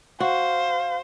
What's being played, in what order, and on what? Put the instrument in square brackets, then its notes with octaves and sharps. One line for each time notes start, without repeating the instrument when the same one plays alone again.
[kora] F#4 [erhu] C5 [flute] F5